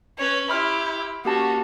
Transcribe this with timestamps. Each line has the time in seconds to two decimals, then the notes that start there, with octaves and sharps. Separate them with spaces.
0.18 C#4 B4 C#5
0.50 E4 G4 B5 C6 F6
1.25 A#3 C#4 F#4 G4 A5